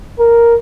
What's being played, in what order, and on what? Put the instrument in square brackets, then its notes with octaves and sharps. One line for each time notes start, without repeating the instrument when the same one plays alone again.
[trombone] A#4